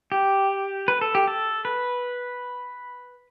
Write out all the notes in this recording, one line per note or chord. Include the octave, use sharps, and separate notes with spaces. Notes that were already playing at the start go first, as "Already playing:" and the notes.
G4
B4
A4
G4
A4
B4